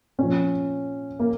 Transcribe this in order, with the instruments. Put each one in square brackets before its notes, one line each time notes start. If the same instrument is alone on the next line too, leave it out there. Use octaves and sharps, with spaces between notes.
[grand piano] A#2 F3 C#4
A#3